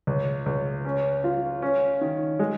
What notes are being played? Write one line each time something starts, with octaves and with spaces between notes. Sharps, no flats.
C#2
C#2
C#4
F4
C#4
D#3
G#3